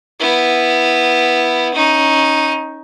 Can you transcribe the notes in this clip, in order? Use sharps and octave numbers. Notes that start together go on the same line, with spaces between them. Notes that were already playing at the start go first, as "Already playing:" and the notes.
B3 E4
C#4 D#4